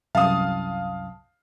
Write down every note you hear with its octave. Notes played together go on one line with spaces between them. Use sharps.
C2 F#2 F5 A5 D#6